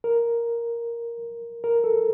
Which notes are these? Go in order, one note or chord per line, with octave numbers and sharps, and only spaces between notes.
A#4
A#4
A4